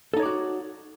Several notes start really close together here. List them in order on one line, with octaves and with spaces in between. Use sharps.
A4 D#4 C#5 D5 F#4